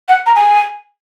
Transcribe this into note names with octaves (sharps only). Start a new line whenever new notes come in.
F#5
A#5
G#5